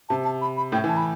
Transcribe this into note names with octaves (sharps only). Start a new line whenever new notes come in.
C3 A5
A5
B5
B5
A2 G5
E3
A5
B5